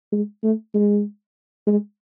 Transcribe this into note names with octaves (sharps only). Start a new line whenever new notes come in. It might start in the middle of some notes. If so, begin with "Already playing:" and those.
G#3
A3
G#3
G#3